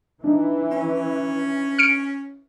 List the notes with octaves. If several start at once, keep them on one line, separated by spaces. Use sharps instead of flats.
E3 D4 D#4
C#4
F6 C#7 D7